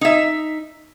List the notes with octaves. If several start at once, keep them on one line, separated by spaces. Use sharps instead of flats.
D#4 E5